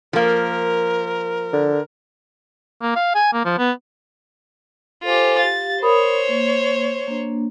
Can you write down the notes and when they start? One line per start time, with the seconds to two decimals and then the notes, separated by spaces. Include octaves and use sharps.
0.13 F3 A#3 A#4
1.53 D3
2.82 A#3
2.96 F5
3.15 G#5
3.33 A#3
3.45 F3
3.58 B3
5.03 F4 G4 A4 C5 G#5
5.39 G4 F5 A6
5.82 A#4 C5 C#5 B5 D#6
6.29 A#3
7.08 A#3 D4